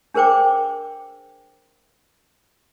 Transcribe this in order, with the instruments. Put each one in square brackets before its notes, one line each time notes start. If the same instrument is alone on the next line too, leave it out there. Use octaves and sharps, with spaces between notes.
[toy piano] D4 G#4 A#4 C5 G5 D6